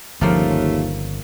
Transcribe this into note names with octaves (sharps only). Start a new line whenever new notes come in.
G1 D#2 C#3 F3 A3 A#3 C#4 F4